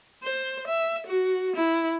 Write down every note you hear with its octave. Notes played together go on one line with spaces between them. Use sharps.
C5
E5
F#4
E4